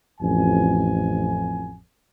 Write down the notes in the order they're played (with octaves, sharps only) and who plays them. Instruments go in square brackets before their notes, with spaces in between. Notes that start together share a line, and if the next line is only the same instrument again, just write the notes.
[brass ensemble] A1 F2 G#5